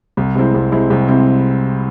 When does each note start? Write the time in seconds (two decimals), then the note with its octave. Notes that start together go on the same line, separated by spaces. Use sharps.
0.17 C2
0.35 C3 G#3 C4 E4
0.54 C2
0.72 C3 G#3 C4 E4
0.90 C2
1.08 C3 G#3 C4 E4